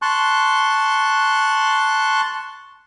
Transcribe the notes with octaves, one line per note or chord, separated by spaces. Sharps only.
A5 C6 C#6 F#6